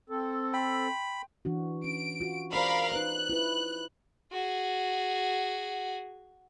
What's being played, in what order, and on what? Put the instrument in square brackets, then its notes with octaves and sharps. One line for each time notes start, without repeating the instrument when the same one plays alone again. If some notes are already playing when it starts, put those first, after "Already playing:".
[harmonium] C4 A4
[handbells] G5 C6 [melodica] B5
[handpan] E3 D4 F#4
[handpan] C#4 [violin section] D7
[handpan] F4 F#4
[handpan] G#4 C5 D5 [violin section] A#4 F5 B5
[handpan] D#4 B4 C5 [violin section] F#6
[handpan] E4 F4 B4
[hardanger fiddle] F#4 G#4